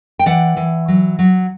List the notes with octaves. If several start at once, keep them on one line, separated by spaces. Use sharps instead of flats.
G5
E3 D5 F#5
E3
F#3
F#3